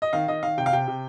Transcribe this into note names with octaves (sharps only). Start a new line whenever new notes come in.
D#5
D#3 F5
D#3 D#5
D#3 F5
C3 G5
F5
C3 G5
C3